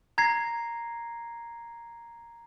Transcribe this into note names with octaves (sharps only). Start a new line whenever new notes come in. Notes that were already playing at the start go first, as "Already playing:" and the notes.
A#5 G#6 A#6 C7